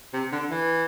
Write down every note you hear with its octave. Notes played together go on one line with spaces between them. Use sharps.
C3
D3
E3